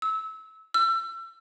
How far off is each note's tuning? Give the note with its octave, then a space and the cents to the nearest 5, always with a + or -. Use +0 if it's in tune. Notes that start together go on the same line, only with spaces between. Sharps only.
E6 -25
E6 +35